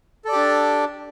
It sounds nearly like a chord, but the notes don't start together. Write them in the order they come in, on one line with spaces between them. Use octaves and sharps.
A4 D5 G4 D4